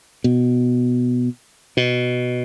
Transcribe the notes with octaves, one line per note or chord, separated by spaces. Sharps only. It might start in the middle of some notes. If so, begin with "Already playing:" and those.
B2
B2